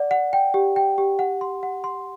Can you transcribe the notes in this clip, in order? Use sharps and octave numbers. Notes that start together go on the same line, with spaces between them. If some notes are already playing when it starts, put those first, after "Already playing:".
Already playing: D5 F#5
F#5
G5
G4
G5
G4
F#5
C6
F#5
C6